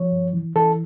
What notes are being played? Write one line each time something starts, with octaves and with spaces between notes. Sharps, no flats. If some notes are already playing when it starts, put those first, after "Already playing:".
Already playing: F3 C#5
G2
E3
E3 A4